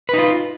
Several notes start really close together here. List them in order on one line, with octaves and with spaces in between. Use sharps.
B4 D#4 F4